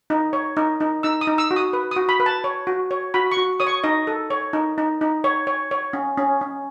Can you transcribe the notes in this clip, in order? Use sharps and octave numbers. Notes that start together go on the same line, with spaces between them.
D#4
C#5
D#4
D#4
D#4 E6
D#6
D#4
E6
F#4
D#6
B4
D#6
F#4
B5
B4
A5
C#5
F#4
C#5
F#4 B5
C#6
F#4
C#5 D#6
C#6
D#4 D#5
A4
C#5
D#4
D#4
D#4
C#5
C#5
C#5
C#4
C#4
C#4